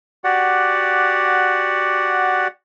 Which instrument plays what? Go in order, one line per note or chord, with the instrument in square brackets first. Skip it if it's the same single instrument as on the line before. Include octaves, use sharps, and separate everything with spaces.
[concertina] F#4 G4 D5 F#5